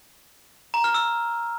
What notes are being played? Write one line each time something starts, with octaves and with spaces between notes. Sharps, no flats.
A#5
F6
E6